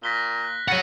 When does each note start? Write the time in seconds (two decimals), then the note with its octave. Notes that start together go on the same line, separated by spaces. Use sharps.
0.03 A#2 A#6 B6 G7
0.44 F#6
0.68 C#3 C#5 F#5 A6 A#6 D#7